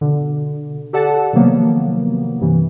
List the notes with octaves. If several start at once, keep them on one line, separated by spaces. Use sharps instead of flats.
B2 D3
G4 A4 D5 F#5 A5
C3 D#3 F3 F#3 A#3 B3
G2 C3 E3